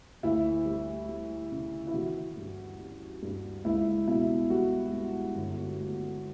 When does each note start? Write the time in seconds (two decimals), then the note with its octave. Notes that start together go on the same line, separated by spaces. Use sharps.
0.23 D2 E4
0.65 G3
1.08 G3
1.51 C#3
1.87 E4
1.94 E3 F#4
2.37 G2
2.79 G3
3.22 G2
3.65 C#2 E4
4.07 B2 E4
4.50 G3 F#4
4.93 G3
5.36 G1
5.78 A3